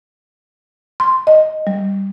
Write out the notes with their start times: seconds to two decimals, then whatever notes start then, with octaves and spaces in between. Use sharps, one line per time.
1.00 C6
1.27 D#5
1.67 G3